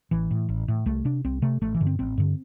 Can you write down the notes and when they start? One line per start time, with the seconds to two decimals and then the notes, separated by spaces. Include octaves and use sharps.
0.11 A1 E3
0.31 A2
0.49 A1
0.68 A2
0.86 C2 A3
1.05 C3 D4
1.25 C2 C4
1.42 C3 A3
1.61 A1 A3
1.74 E3
1.81 G2 D3
1.87 C4
1.99 A1 C4
2.18 G2 D3